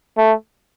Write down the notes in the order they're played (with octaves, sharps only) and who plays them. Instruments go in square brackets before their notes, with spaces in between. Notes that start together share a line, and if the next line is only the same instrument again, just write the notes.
[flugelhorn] A3